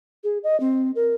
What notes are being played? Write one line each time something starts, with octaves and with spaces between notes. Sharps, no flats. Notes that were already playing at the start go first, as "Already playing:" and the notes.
G#4
D#5
C4
A#4